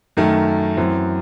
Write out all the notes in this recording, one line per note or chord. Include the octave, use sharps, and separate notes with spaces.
F#2 D#3 A3
F#2 E3 C4